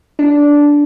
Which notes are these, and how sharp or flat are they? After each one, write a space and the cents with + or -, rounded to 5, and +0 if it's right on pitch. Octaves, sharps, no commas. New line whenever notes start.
D4 -10